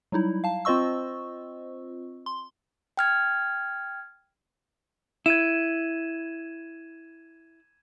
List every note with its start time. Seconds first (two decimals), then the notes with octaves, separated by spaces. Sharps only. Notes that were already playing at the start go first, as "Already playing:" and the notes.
0.12 F#3 G3 D#4 E4
0.44 F5 A5
0.65 C4 F4 C5 D#5 C#6 E6
2.26 C6
2.97 G5 F6 G#6
5.26 E4 G#6 D#7 E7